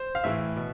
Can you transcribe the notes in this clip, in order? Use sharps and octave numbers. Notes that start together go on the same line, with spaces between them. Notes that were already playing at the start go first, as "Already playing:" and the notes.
Already playing: C5
F5
A2 E3 E5
B2